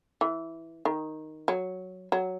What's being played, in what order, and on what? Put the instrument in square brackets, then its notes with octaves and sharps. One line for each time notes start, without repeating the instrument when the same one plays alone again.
[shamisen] E3
D#3
F#3
F#3